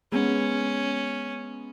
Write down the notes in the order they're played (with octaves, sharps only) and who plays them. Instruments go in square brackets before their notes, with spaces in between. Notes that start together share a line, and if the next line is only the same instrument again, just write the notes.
[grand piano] G#3 B3 G#5 [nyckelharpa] C#4